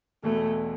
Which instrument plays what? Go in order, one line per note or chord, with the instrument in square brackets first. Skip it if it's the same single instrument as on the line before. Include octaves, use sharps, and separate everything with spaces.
[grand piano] E1 E2 B2 [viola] A3